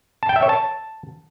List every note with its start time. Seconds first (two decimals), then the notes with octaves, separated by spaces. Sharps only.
0.23 A5
0.29 G5
0.36 E5
0.43 C#5
0.49 A5